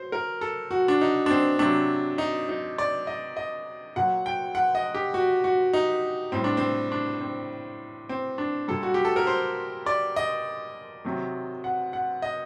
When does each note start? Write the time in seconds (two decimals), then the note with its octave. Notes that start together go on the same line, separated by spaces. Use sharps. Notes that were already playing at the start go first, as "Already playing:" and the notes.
Already playing: F#3 C5
0.12 A#4
0.41 A4
0.71 F#4
0.88 D4
1.01 D#4
1.26 D4
1.31 C4
1.59 C3 F#3 D4
2.18 D#4
2.49 D#4
2.78 D5
3.07 D#5
3.37 D#5
3.96 A#2 F#3 F#5
4.26 G5
4.55 F#5
4.75 D#5
4.94 G4
5.14 F#4
5.44 F#4
5.73 D#4
6.32 A2 G3 C4
6.44 D4
6.57 C4
6.92 D4
7.21 C4
8.09 C4
8.38 D4
8.68 A#2 G3 A4
8.83 F#4
8.94 G4
9.05 A4
9.16 A#4
9.27 C5
9.86 D5
10.16 D#5
11.05 C3 D#3 F#3
11.64 F#5
11.93 F#5
12.22 D#5